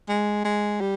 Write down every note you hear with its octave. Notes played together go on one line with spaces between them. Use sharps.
G#3
G#3
G3